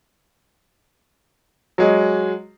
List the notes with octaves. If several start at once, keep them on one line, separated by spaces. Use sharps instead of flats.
F#3 G#3